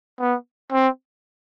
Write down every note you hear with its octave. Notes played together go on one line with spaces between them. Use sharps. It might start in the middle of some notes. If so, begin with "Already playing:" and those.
B3
C4